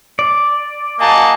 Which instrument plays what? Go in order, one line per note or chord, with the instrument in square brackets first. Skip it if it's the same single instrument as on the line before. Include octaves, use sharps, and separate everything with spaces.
[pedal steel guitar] D5
[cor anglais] A#3 [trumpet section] F#4 D#5 A5 [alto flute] G#5